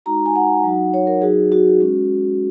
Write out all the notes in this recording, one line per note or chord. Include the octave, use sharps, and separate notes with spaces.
G#3 D#4 F#4 A#5
G#5
F#5
F#3 D#4 F#4
C#5
A#4
F#3 D#4 F#4 G#4
F#4
G#3 C#4 F#4